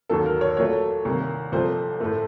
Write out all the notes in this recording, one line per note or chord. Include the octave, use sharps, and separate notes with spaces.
D#2 D#3 F#3 A#3 A4
A#4
C#5
A#2 F#3 A3 C#5
C2 C3 D#3 A#3
C2 A#2 F3 A3 C5
A2 A3